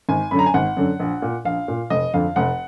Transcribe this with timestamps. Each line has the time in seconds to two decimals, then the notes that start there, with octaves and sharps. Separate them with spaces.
0.09 G#1 G#5
0.31 F#2 D3 B5
0.39 A#5
0.46 G#5
0.54 G#1 F#5
0.77 F#2 D3
1.00 A#1
1.22 A#2
1.45 A#1 F5
1.68 A#2
1.90 F1 D#5
2.14 F2 D3 F5
2.36 F1 F#5